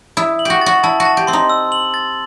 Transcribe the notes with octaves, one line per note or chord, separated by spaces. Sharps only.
E4 D#6
F#7
F#4 G4
F#4 A6
E4 A5
F#4
A5
G4
C4 C6
D#4
E6
F#7
A6